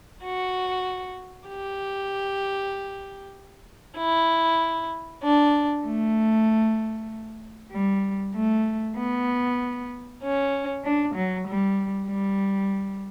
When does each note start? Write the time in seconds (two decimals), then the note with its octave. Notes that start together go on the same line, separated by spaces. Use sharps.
0.24 F#4
1.49 G4
3.98 E4
5.23 D4
5.85 A3
7.71 G3
8.34 A3
8.97 B3
10.22 C#4
10.84 D4
11.15 F#3
11.47 G3
12.08 G3